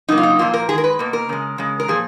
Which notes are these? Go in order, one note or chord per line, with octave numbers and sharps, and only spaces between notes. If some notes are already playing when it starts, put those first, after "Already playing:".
C#3 F#3 A#3 D#4
F4
D#4
A#2 F3 A#3 F4
A#4
D#3 G#3 G#4
A#4
B4
B2 A#3
A#4
C#3 G#3
C#3 G#3
A#4
A#2 F3 G#4